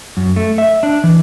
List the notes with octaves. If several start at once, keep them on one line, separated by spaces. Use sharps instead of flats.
F#2
A3
E5
D4
E3